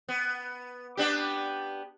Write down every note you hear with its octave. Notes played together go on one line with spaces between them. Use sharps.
B3
B3 D4 G4